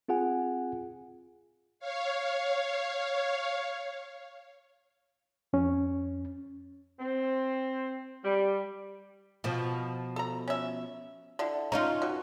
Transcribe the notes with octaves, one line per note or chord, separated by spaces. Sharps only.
C4 F4 G#4 F#5 G#5
C#5 F5
F2 C#4
C4
G3
B2 F3
A4 A#5
C#4 E5
D3 E4
C#4 D#4 F4 A#5
B2